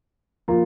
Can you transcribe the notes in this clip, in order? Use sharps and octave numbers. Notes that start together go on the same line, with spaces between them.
F3 A#3 F4